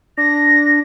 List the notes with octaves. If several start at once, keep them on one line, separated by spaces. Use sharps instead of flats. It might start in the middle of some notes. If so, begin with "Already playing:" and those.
D4 A#6